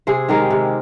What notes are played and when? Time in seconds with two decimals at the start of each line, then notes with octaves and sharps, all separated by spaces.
0.07 C3 G#4 C5
0.28 D#3 G#3 D#4 G4 A#4
0.51 C3